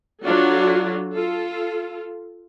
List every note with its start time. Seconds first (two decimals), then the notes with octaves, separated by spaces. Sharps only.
0.24 F#3 D4 F4 F#4 A4
1.13 F4 A4